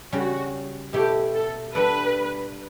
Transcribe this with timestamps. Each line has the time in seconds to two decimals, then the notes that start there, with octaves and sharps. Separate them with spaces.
0.12 C#3 G3 C#4 F#4
0.93 B2 A3 E4 G4
1.34 A4
1.75 G3 D4 A4 B4 D5